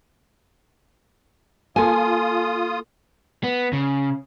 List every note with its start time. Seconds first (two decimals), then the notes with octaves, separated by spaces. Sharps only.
1.76 A#3 F4 A4 G#5 D#6
3.44 B3
3.73 C#3